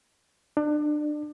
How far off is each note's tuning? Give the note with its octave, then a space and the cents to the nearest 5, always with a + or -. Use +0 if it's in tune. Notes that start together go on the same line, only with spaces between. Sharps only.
D4 +30